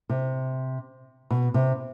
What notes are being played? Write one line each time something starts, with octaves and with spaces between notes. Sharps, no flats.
C3
B2
C3